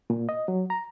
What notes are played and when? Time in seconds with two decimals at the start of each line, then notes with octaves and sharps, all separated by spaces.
0.10 A#2
0.29 D#5
0.48 F#3
0.70 A#5